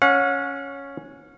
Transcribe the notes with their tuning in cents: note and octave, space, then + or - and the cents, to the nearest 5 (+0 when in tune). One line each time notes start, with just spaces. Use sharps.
C#4 +0 F#5 -40